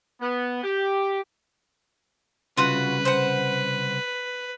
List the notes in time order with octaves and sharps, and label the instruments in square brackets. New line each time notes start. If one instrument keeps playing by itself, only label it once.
[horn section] B3
G4
[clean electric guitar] C2 C#3 [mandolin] F4 F#4 [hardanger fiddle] B4
[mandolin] C5 F#5